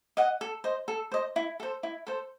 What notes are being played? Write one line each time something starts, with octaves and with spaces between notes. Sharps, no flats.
D#5 F#5
A4
C5 D#5
A4
C5 D#5
E4
A4 C5
E4
A4 C5